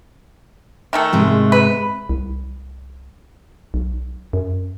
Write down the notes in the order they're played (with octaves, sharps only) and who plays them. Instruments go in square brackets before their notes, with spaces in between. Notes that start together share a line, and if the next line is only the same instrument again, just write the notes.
[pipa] D#3 A3 A4
[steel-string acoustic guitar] G#2 C3 G#3
[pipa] B4
[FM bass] C2
B1
F#2